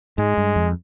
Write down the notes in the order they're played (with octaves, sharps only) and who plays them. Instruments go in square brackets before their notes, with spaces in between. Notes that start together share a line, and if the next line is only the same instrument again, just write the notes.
[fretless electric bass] G#2 [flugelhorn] G#3
[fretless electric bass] G2
F2